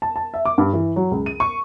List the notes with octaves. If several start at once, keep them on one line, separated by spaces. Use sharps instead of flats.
A5
A5
E5
D6
G2
E3
F#3
C#2
D#7
C#6